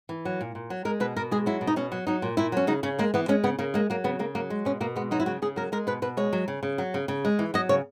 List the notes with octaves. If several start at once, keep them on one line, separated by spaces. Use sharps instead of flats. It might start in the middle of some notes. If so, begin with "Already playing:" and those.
E3
F#3
A#2
A#2
F#3
G#3 A#4
B2 B4
B2 A#4
G#3 G#4
F#3 E4
B2
D#4
B2 C#4
F#3
F#3 D#4
A#2
A#2 E4
F#3 C#4
C#3 D#4
C#3 C#4
G#3 A#3
E3 B3
G#3 C#4
C#3 B3
C#3 A#3
G#3 A#3
F#3 A#3
C#3 B3
C#3 A#3
F#3 A#3
G#3
B2 C#4
B2 A#3
G#3 B3
F#3 D#4
E4
C#3 F#4
C#3 G#4
F#3 A#4
G#3 A#4
B2 B4
B2 B4
G#3 C#5
F#3
C#3
C#3
F#3
C#3
C#3
G#3
E3
F#3 D#5
C#3 C#5